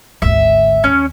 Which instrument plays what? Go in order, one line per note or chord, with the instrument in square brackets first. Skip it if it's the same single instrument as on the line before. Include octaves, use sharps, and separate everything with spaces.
[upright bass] G#1 D2 [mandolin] E5
[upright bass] D#2 [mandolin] C#4